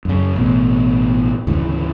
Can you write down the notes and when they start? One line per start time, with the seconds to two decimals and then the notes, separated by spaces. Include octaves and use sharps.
0.05 F#2 C#3
0.36 A1 B2
1.47 D2 G#2 C#3 E3